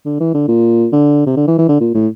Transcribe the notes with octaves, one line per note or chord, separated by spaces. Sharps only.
D3
E3
D3
A#2
D3
C3
D3
E3
E3
D3
A#2
A2